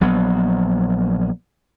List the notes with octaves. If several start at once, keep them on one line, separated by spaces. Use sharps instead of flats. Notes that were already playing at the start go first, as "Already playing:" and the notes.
A#1 F#3 B3